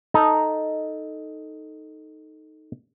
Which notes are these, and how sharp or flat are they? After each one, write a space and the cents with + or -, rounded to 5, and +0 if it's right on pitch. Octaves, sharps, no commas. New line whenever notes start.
D#4 +0 A4 +0